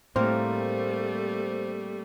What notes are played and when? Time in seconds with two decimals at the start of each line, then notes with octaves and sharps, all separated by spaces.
0.16 A2 G3 A3 A#3 C4 A#4 C5